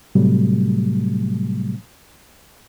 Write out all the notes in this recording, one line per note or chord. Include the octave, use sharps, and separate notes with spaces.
A2 C3 F#3 G3 A3